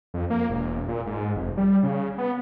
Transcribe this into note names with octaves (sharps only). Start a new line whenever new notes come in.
F2
A#3
E1
A#2
G#2
F1
G3
C#3
B3